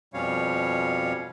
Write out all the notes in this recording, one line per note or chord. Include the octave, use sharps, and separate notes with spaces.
F2 B2 G3 C#4 C#5 F5